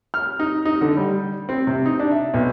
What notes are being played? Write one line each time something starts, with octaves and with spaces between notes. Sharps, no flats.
F6
D#4
D#4
D3
G3
C4
C3
D#4
D4
E5
B1